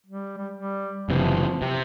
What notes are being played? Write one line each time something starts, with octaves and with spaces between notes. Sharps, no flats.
G3
G3
G3
F#1 C3 E3 F3
C3